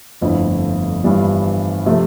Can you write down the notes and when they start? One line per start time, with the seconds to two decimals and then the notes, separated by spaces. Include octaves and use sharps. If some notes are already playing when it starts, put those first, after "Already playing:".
0.21 G1 F2 D3 A3 E4
1.04 G1 G2 E3 G3 D4
1.86 C3 F3 A3